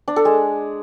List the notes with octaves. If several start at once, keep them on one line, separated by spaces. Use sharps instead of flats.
D4
A4
G#3